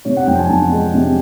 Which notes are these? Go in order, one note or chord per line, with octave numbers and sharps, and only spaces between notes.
C3 C#5
F#5
F2 G5
G#5
F2 A5
G#3
C3